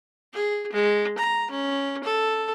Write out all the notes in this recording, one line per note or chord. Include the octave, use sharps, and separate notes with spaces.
G#4
G#3
A#5
C#4
A4